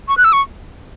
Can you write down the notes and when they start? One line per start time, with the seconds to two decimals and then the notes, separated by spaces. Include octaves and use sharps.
0.08 C#6
0.17 F#6
0.24 E6
0.33 C#6